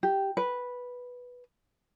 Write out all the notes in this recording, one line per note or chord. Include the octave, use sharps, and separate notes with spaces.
G4
B4